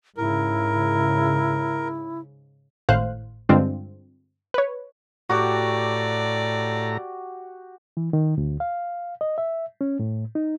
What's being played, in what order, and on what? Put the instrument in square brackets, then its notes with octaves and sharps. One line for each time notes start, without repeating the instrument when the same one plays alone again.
[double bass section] G#2 C#3 [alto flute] E4 [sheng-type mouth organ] A#4
[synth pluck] G#1 A2 C5 F5 F#6
G2 D3 G#3 C4 D4 F4
B4 C#5
[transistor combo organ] A2 A#5 [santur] F#4 G4 [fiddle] D5
[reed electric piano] E3
D#3
D2
F5
D#5
E5
C#4
A2
D#4